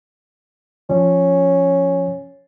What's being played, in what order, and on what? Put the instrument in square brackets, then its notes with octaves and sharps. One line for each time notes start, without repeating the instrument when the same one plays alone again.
[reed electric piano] F3 [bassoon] C#4